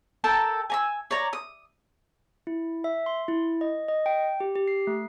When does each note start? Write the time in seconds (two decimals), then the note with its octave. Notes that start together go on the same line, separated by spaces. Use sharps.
0.24 A4 A#4 G5 A5
0.70 G#5 A#5 E6
1.11 C#5 D5 A#5
1.33 D#6
2.47 E4
2.84 E5
3.06 C6
3.28 E4
3.61 D#5
3.88 D#5
4.06 G5
4.40 G4
4.55 G4
4.68 C7
4.87 A3